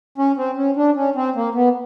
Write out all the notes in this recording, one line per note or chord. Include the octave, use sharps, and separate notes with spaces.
C#4
C4
C#4
D4
C#4
C4
A#3
B3